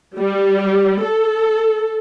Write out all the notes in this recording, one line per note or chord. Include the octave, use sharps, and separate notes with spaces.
G3
A4